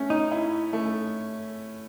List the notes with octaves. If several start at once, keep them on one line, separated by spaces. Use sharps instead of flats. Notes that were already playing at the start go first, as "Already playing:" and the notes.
Already playing: A3 C#4
D#4
E4
A3